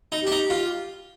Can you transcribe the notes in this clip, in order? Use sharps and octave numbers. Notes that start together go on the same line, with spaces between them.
D#4
D4 G4
D#4
F4